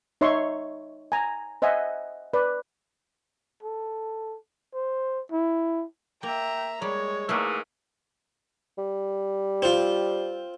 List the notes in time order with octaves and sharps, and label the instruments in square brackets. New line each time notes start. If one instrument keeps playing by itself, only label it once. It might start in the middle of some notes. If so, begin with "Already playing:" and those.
[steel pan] D#4 C#5 E5 C6 C#6
G#5 A#5
C5 D#5 E5 F#5 G#5
B4 D5
[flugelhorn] A4
C5
E4
[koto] A#3 [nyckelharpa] E5 A#5 [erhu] G5
[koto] G3 [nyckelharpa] G#3 [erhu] C#5
[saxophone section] G#2 E3 G#4 [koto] A3 A#3
[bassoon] G3
[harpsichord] C4 F4